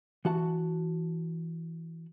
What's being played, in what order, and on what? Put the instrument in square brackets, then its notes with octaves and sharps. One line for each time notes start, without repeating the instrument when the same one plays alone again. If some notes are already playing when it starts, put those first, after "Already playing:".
[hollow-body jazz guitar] E3 F#4 A5